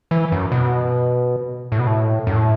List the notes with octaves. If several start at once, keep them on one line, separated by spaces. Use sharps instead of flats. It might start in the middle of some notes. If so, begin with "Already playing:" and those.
E3
F#2
B2
A2
B2
A2
F#2
A2